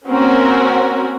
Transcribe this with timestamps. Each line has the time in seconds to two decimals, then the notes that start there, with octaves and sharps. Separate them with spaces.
0.10 A#3 C4 C#4 F#4 A#4